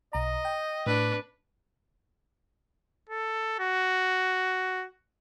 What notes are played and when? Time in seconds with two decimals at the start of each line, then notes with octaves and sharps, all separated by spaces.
0.13 B1 D#5 A#5
0.45 G5
0.86 A2 D4 B4
3.09 A4
3.60 F#4